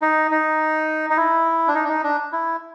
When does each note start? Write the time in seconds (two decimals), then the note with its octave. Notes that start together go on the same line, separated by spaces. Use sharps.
0.02 D#4
0.31 D#4
1.10 D#4
1.17 E4
1.68 D4
1.75 D#4
1.84 D4
1.88 D#4
2.04 D4
2.32 E4